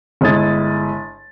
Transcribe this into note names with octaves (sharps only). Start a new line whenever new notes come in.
G1 G#3 E4 D#6 A6